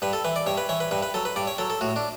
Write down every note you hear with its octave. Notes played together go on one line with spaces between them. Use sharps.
G2 B4
A4
E3 B4
D5
G2 C#5
B4
E3 C#5
B4
G2 B4
B4
F#3 A4
B4
G2 D5
C#5
F#3 A4
A4
A2 F#4
D4